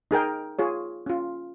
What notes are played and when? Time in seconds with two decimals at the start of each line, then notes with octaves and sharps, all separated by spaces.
0.11 D#4 G#4 A#4 G5
0.59 F4 G#4 C#5
1.06 C#4 F4